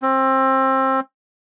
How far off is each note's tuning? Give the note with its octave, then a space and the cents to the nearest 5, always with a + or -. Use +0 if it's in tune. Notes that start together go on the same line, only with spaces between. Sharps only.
C4 +25